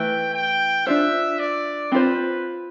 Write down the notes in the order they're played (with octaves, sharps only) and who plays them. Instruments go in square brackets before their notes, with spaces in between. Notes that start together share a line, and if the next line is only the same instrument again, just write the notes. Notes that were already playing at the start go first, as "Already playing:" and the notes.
Already playing: [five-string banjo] E3 A3 E4 B4 [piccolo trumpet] G5
[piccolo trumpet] G5
[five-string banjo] D4 F4 C5 [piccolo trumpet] E5
[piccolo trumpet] D5
[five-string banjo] C4 F4 C5 [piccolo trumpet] B4